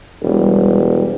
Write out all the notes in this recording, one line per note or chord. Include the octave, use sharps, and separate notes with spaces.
E1 G3